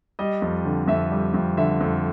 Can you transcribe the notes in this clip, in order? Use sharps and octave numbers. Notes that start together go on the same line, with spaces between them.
G3 D#5
F2
D3
F2 E5
G3
F2
D3 E5
F2